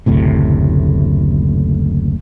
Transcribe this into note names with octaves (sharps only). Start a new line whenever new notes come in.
F#1 D2 A2 C3